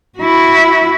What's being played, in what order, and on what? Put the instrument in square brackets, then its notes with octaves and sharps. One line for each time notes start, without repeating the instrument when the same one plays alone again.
[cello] E4 F#4